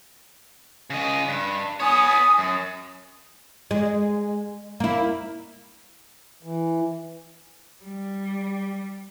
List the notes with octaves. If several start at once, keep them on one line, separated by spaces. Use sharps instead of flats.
C#3 D#5
G2
B3 C#5 G#5 D#6
F#2
G#3
A#3 E4
E3
G3